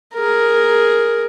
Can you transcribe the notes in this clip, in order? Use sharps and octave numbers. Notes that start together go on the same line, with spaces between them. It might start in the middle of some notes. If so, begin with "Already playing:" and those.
G#4 A#4